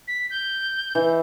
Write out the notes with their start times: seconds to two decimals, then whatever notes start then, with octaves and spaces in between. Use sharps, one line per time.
0.08 B6
0.30 G6
0.95 E3